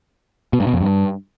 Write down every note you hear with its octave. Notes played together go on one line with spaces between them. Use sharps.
B2
G2
B2
F2
G2